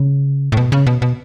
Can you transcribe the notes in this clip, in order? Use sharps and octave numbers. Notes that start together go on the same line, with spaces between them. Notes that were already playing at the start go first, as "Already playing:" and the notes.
Already playing: C#3
A2
B2
C#3
B2
B2